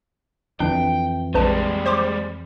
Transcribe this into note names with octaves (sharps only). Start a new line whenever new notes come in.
F2 E3 D4 G5
A#1 G3 G#3 B4 A5
C5 C6 D6